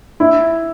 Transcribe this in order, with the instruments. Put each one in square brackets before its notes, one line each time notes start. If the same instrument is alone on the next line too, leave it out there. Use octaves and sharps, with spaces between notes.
[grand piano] E4